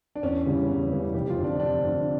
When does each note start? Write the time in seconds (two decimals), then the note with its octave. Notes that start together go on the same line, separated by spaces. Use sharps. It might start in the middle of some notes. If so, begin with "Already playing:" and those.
0.15 D4
0.23 E2 C#4
0.46 C#3 E3 G3
0.68 E2
0.91 C#3 E3 G3
1.14 F1 G4
1.30 F4
1.38 F2 D3
1.44 D4
1.60 F1 D4
1.83 F2 D3